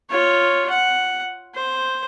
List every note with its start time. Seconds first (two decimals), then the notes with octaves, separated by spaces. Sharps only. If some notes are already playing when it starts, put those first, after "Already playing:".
0.10 F4 C#5
0.70 F#5
1.54 C5